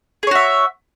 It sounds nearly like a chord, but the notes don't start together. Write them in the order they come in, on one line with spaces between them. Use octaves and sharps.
G#4 C#5 F#4 E5